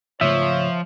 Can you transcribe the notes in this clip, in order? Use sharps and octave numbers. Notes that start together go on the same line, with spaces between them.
G#2 C#3 F3 A3 C#5 E5